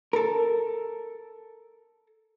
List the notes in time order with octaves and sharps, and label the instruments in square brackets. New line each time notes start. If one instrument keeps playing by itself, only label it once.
[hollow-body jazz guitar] A4 A#4